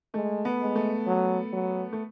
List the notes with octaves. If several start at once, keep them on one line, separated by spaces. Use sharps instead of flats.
G#3 A3
B3
G#3
A3
F#3
F#3
A3